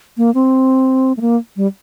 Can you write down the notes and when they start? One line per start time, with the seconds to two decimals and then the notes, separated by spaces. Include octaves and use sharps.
0.17 A#3
0.34 C4
1.17 A3
1.21 A#3
1.57 G3